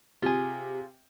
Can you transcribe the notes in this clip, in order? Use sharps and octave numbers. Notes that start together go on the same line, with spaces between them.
C3 F4 G#4